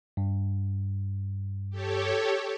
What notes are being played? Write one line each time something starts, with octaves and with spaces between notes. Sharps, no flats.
G2
G4 A4 C#5